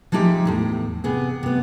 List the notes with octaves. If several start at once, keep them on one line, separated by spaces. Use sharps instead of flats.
F3 G#3 D#4 G4 E5
E2 A2 C3
C3 B3 G#4
C3 B3